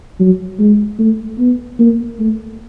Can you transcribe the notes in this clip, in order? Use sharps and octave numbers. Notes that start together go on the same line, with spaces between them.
F#3
G#3
A3
B3
A#3
A3